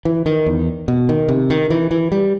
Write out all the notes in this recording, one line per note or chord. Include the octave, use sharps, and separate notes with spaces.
E3
D#3
E2
B2
D#3
C3
D#3
E3
E3
G3